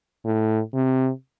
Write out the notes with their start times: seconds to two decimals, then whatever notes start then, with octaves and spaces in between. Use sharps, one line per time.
0.25 A2
0.74 C3